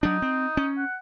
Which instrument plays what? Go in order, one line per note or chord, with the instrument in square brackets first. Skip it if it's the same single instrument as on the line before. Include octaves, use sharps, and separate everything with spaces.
[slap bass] F#3 D4 [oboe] D#4
[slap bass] C4
C#4
[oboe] F#5